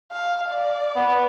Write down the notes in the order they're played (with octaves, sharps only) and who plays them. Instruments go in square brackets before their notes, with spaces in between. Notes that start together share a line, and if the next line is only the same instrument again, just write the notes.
[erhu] F5
D5
[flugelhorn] B3